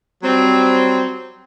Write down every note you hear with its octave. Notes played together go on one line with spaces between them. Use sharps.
F#3 G3 C4